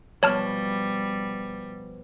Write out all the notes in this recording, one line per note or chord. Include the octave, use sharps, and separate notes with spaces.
B2 F3 G3 C#5 A5 F6